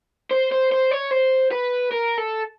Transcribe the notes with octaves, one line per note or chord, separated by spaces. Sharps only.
C5
C5
C5
C#5
C5
B4
A#4
A4